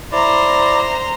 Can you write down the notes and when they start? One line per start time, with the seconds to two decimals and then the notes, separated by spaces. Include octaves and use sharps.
0.12 E4 C5 D5 A#5